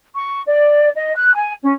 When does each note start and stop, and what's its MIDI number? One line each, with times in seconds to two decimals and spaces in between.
0.15 0.41 85
0.47 0.89 74
0.96 1.14 75
1.16 1.33 90
1.35 1.54 80
1.63 1.72 61